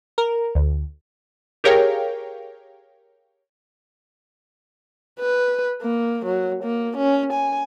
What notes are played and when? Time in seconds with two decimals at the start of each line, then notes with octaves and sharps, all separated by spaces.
0.18 A#4
0.55 D2
1.64 G4 G#4 A#4 C#5 F5 G5
5.20 B4
5.82 A#3
6.26 F#3
6.64 A#3
6.97 C#4
7.33 G#5